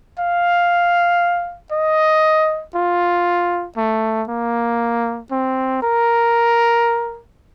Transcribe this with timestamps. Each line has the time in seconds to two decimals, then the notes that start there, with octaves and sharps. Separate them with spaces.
0.19 F5
1.72 D#5
2.75 F4
3.77 A3
4.28 A#3
5.31 C4
5.82 A#4